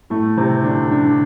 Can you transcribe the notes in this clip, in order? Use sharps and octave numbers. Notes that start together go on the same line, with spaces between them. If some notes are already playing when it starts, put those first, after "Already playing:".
A2 A3
C3 C4
D3 D4
D3 D4